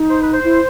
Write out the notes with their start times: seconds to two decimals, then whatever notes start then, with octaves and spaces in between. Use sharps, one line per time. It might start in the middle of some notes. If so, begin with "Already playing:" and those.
Already playing: D#4
0.09 C5
0.22 B4
0.33 C5
0.44 E4